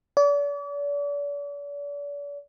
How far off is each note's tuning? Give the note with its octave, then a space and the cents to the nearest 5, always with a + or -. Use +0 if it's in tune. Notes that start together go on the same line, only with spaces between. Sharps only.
D5 -40